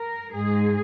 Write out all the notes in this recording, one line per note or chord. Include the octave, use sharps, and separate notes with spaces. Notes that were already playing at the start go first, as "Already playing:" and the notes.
Already playing: A#4
G#2 G#3 G#4